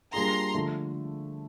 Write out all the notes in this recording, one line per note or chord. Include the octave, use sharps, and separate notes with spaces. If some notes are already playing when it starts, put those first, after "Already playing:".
G3 A#3 D4 F4 G#4 A#5 C6
D3 F3 A3